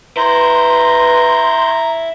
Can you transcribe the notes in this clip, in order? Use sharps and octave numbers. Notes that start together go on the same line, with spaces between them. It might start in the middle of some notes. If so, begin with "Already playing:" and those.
E4 B4 A#5 C6 G6